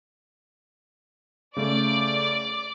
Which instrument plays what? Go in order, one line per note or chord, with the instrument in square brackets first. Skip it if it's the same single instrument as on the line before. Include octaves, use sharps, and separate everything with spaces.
[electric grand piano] C#3 A3 [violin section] D5 D6